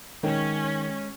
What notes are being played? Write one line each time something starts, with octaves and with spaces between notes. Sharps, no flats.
D#3 G#3 C#4 C#5